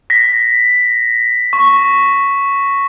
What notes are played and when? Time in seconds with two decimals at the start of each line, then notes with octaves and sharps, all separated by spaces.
0.10 A#6 B6
1.53 C#6